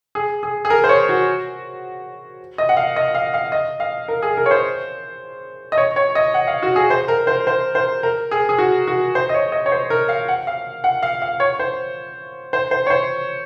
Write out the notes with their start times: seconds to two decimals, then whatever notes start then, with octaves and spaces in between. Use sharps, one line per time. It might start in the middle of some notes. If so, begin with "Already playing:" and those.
0.15 G#4
0.43 G#4
0.65 G#4
0.70 A#4
0.84 C5
0.89 C#5
1.09 F#4
2.58 D#5
2.69 F#5
2.77 F5
2.96 D#5
3.15 F5
3.34 F5
3.52 D#5
3.80 F5
4.08 A#4
4.22 G#4
4.37 A#4
4.46 C#5
4.51 C5
5.72 D#5
5.78 C#5
5.96 C#5
6.15 D#5
6.34 F#5
6.47 F5
6.63 F#4
6.76 G#4
6.90 C5
7.08 A#4
7.27 C5
7.47 C5
7.75 C5
8.03 A#4
8.31 G#4
8.49 G#4
8.58 F#4
8.87 F#4
9.15 C5
9.29 D#5
9.34 C#5
9.52 D#5
9.66 C#5
9.72 C5
9.90 A#4
10.09 F5
10.28 F#5
10.47 F5
10.84 F#5
11.03 F5
11.22 F5
11.40 C#5
11.59 C5
12.53 C5
12.71 C5
12.86 C#5
12.90 C5